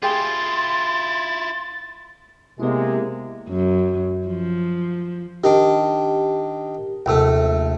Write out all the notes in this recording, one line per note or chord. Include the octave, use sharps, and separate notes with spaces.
E4 F4 G4 G#4 G5 C6 A6
C3 G#3 A#3 B3 E4
F#2
F3
D#3 D4 G4
A#1 D#2 C3 A3